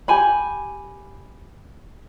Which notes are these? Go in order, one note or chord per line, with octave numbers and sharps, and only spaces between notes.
G4 G#5 B5